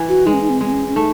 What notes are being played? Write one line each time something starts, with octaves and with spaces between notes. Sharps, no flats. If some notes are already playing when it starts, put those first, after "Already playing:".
Already playing: E3
F#4
G#3 D#4
C#4
D#4
C4
G#3 C4
C#4
C#4
A3 D#4